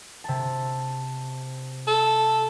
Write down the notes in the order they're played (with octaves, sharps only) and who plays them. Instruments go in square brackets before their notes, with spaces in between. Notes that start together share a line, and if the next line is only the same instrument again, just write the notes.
[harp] C3 A5
[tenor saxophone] A4